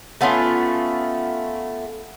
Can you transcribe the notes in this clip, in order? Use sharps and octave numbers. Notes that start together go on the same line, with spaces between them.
A3 B3 C#4 F4